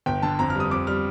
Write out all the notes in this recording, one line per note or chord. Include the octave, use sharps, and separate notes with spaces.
G1 G5
D3 A5
F2 A#5
F6
G3
D#6
F2 D6
G3 F6